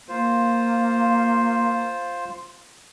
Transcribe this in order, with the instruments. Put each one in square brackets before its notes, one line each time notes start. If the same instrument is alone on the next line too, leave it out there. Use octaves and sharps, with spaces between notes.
[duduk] A#3 [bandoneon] F4 C5